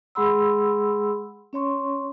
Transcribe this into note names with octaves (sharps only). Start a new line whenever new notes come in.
G#3 G#4 F#5 B5 C6 E6
C#4 C#5 C6 C#6